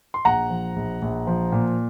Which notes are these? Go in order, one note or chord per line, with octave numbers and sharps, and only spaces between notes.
C6
A#1 F#5 A#5
F3
A#1
A#1
F3
A#2